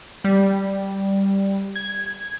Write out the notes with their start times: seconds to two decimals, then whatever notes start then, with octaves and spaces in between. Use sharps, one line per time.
0.24 G3
1.76 G#6